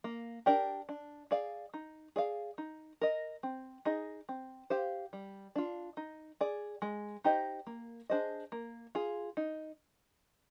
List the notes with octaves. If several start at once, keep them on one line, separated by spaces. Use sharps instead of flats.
A#3
D4 G4 A#4 D5
D4
G#4 D5 F5
D#4
G#4 D5 F5
D#4
A#4 D#5
C4
D#4 G#4 D#5
C4
G4 C5 F5
G3
D4 F4
D#4
G#4 D5
G#3
D#4 G4 C5 D#5
A#3
D4 G#4 C5 D#5
A#3
F4 G#4
D#4